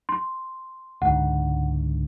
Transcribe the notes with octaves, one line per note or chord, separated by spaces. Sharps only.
C6
C#2 G#2 D3 F#5